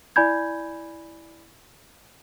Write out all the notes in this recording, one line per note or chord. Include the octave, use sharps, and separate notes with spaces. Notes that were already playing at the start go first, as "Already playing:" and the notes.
E4 D5 G#5 B5 G6 G#6